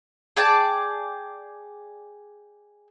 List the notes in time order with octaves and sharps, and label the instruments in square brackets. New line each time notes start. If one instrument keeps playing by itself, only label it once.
[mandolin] G#4 D5 G5 A5